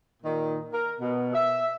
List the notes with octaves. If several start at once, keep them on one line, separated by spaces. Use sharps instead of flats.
A#2 D#3
A#4
B2
E5